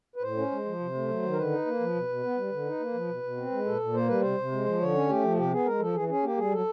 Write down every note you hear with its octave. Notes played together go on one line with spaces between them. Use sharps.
B4
A2 C5
C#4
G#3
F3
C3
A3
F#3
D#3
A#4
D3 B4
D#4
A#3
F3
B2
B2
B3
G3
D3
D#4
A#3
F3
B2
B2
C4
G#3
A#2 A4
A#2
A#3 C5
G3 B4
C3 C5
C3
G#3
F3
D3 C#5
C#4
A3 G4
F3
C3 G4
B3 G#4
G#3 A#4
F3 A4
E3 G#4
C#4 G#4
A#3 G4
G3 G#4
F#3 A4